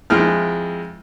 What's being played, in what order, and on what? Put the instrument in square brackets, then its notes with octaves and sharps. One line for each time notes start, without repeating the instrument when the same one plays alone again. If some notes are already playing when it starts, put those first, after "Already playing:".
[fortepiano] F2 G#3 E4 F6